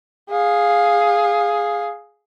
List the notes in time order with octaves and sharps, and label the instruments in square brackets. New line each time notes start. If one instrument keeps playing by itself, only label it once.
[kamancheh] G#4 F5